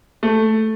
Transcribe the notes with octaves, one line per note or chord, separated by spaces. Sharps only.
A3